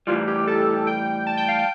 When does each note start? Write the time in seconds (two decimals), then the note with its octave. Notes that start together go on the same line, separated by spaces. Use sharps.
0.07 A2 E3 G3 F4
0.27 G4
0.47 A4
0.87 G5
1.26 A5
1.37 G5
1.48 F5
1.59 G5